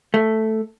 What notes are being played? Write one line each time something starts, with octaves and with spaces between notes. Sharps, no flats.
A3